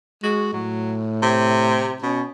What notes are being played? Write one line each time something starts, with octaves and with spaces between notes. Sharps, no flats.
G#3 F#4
A2 F#3
C3
B2 C#4